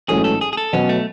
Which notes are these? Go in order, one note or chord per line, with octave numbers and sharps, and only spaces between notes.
A1 G#2 F#3 A3 C#4 G#4
A4
G#4
G#4
A4
B2 F#3 B3 C#4
A3